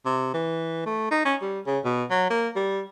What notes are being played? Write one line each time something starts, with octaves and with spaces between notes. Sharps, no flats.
C3
E3
A3
D#4
C#4
G3
C#3
B2
F#3
A#3
G3